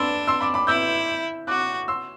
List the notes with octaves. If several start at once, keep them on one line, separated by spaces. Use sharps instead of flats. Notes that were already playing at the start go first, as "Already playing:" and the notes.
Already playing: D4 B5 C6 E6
C6 E6
B5 D6
B5 D6
E4 E6 G6
F#4 D6 F#6
C6 E6